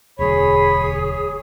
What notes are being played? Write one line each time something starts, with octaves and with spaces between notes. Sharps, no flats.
E1 D2 F#3 G#4 C#5 B5